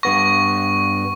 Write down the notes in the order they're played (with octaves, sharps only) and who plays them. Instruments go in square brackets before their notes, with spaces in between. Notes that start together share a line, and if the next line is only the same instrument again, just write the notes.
[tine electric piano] G2 B3 A#6 [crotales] C#6